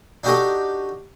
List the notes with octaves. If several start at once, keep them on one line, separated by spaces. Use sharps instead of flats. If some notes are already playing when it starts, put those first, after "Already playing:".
D4 D#4 F#4 G4 A4 D#5